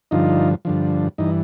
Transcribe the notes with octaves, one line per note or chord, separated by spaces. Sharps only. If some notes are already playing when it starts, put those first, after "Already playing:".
G2 D3 F3 D#4 F4
G2 D3 F3
G2 E3 D#4